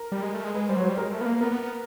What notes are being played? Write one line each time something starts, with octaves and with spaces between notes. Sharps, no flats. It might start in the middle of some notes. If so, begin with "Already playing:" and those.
Already playing: A#4
G3
G#3
A3
G#3
G#3 B4
G3 C5
F#3 C#5
C5
G3
G#3 A#4
A3
B3
A#3
B3 A#4
B3
B3